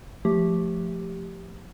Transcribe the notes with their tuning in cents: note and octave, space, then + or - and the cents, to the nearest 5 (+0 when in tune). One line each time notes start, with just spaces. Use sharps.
F3 +0 A3 +0 G4 +0